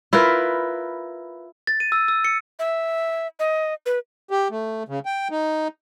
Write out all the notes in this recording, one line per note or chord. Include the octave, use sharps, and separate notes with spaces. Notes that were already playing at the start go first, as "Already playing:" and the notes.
E4 F4 A#4 B4
A6
D#7
E6
E6
C#7
E5
D#5
B4
G4
A3
C#3
G5
D#4